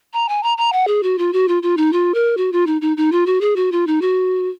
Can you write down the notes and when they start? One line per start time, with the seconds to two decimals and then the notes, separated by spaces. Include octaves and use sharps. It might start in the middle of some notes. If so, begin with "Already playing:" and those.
0.13 A#5
0.29 G#5
0.43 A#5
0.58 A#5
0.73 F#5
0.87 G#4
1.03 F#4
1.18 F4
1.33 F#4
1.48 F4
1.63 F4
1.77 D#4
1.93 F4
2.14 A#4
2.37 F#4
2.52 F4
2.67 D#4
2.81 D#4
2.97 D#4
3.12 F4
3.26 F#4
3.41 G#4
3.56 F#4
3.72 F4
3.87 D#4
4.02 F#4